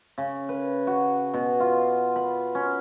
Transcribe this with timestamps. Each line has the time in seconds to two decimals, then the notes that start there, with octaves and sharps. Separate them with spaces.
0.18 C#3
0.49 B4
0.87 F#4
1.34 B2
1.60 F4
2.16 B5
2.55 C#4